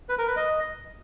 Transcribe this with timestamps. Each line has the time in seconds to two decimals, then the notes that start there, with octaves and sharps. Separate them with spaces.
0.09 B4
0.18 A#4
0.27 B4
0.36 D#5